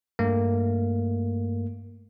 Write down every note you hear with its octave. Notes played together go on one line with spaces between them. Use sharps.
G2 A3 A#3